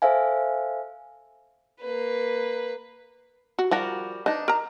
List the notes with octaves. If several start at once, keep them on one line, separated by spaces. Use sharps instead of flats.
A4 C5 E5 F5 G#5
A#3 B4
F#4
F3 G3 F#4 A#4
D4 D#4 B4
A#4 A#5